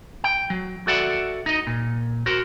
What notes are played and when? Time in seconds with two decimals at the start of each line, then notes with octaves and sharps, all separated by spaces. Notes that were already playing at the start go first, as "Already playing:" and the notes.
0.24 G5
0.50 F#3
0.87 F#4 A4 D5 E5 F#5
1.46 D#4 D#5
1.67 A#2
2.26 F#4 A#4 C5